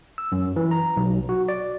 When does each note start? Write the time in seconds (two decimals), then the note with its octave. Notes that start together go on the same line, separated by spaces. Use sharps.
0.18 E6
0.32 F#2
0.56 E3
0.71 A#5
0.97 B1
1.29 F#4
1.49 D5